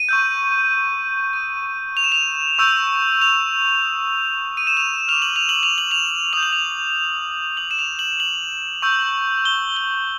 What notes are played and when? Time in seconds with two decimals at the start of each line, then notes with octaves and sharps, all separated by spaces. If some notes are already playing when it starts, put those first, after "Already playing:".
Already playing: D#7
0.09 C#6 E6 G6
1.33 D#6 G6 D#7
1.97 F7
2.04 E7
2.12 F7
2.59 C#6 E6 G6
3.22 F7
3.83 D#6 F#6
4.57 D#7
4.67 E7
4.77 F7
5.08 D6 F6 F7
5.22 F#7
5.36 F7
5.49 F#7
5.63 F7
5.78 F#7
5.91 F7
6.33 D#6 G6 F7
6.43 F#7
6.53 F7
7.57 D#6 F#6 F#7
7.71 E7
7.79 F7
7.99 F#7
8.20 F#7
8.82 C#6 E6 G6
9.45 G7
9.77 G7